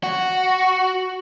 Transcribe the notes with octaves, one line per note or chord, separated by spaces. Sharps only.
F#4